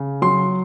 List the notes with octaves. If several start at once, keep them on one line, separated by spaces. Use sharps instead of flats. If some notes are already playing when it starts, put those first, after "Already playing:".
Already playing: C#3
F#3 C6